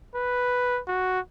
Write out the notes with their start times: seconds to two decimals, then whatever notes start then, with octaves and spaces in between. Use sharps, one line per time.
0.15 B4
0.88 F#4